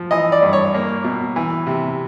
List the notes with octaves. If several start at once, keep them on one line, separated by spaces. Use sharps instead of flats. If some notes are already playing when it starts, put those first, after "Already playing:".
Already playing: F3
E3 D#5
D5
G2
C#5
A#3
B2
E3
C3